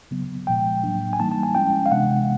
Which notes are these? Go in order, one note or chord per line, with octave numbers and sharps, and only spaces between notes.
C#3 F#3 B3
A#2 F3 G#3 G5
A2 F#3 A#3 D4
G#5
E3 G3 A#3 D#4 A5
A5
G#5
F3 G#3 C#4 E4 G5
F5
C3 E3 G#3 B3 D4 F#5